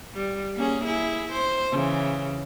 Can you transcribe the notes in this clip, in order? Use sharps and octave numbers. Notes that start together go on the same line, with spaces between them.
G3
A#3 C#4 G#4
E4 G#4
C5
C#3 E3